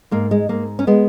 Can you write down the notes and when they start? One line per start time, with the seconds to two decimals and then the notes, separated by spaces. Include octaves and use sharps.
0.11 G#2 A#3
0.31 G#3
0.49 G#2 A#3
0.79 C#4
0.87 G#3 B3